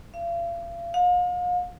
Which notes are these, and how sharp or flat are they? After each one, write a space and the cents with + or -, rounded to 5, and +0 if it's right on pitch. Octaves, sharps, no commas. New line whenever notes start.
F5 -40
F5 +40